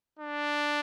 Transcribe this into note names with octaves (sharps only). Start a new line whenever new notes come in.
D4